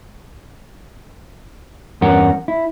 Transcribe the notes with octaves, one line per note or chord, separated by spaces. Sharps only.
E2 G2 C#4 A#4 F#5
E4